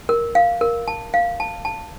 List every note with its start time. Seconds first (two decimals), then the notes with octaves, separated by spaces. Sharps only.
0.09 A#4
0.35 F5
0.61 A#4
0.88 A5
1.14 F5
1.40 A5
1.65 A5